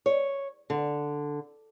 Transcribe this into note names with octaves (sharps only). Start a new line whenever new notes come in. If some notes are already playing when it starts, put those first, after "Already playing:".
C#5
D3